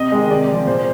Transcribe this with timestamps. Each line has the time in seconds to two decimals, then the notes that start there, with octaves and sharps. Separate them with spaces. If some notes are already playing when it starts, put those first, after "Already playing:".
Already playing: C3 D#5
0.12 D#3 G#3
0.30 C3 D5
0.48 F3 G#3
0.67 A#2 C5